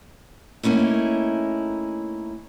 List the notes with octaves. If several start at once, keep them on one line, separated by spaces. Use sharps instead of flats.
A3 A#3 C#4 D#4 E4